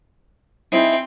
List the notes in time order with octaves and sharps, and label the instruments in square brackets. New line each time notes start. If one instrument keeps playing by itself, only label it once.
[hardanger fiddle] C4 [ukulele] D#4 E4 G#4